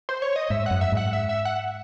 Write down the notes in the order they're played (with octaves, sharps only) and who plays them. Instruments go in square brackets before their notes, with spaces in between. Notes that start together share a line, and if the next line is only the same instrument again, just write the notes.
[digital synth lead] C5
C#5
D#5
[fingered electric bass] G#2 [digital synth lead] E5
[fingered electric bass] F#2 [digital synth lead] F#5
[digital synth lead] E5
[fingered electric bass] G#2 [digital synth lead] F#5
[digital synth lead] E5
E5
F#5